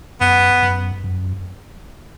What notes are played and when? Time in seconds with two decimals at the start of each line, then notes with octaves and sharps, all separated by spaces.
0.21 F#2 B3
0.62 F#2
1.04 F#2